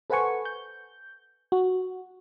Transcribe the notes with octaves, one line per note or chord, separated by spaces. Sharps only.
A4 B4 C5 F#5 G#5 C#6
G6
F#4